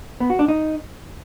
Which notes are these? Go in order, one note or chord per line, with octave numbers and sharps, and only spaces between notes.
B3
F#4
D4
D#4